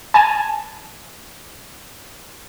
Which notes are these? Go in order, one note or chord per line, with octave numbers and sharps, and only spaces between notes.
G#5 A5